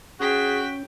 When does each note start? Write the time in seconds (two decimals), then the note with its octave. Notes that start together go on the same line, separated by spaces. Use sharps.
0.20 C#4 F#4 G#4 G5 B6